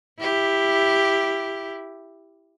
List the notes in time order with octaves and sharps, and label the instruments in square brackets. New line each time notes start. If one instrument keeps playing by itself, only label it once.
[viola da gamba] E4 G4